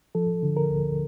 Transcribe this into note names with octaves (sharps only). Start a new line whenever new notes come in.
F3 A4
D3
A#4
D2